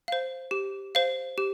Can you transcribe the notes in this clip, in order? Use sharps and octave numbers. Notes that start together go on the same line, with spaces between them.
C5 F5
G4
C5 F5
G4